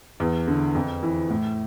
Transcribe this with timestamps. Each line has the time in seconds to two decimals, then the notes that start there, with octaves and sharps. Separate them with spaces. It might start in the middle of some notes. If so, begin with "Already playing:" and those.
0.20 E2
0.47 D3
0.75 F2
1.03 E3
1.30 A2